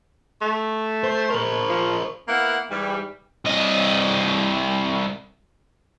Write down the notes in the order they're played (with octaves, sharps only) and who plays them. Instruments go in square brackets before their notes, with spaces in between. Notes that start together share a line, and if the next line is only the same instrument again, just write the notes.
[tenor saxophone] A3
[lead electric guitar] C5
A#4 C5
[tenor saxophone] F3
[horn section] A#3 B3 E4 F5 F#5
G#2 E3 G3
[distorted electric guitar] C2 D#5